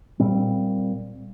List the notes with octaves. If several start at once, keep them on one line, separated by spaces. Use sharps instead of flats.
A#2 G3 C4